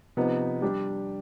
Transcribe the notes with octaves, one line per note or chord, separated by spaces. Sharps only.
C3 F3 B3 D#4
G3 D4 G4